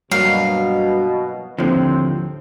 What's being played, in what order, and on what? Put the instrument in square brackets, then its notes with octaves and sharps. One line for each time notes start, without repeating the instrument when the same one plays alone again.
[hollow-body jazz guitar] G2 [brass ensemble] B2 [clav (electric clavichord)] F#3 A#3 [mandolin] F5
[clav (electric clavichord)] D#2 A2 [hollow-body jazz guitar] D3 F3 [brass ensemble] C4